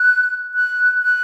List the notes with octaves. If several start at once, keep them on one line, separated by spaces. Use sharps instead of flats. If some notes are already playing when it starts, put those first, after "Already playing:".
Already playing: F#6
F#6
F#6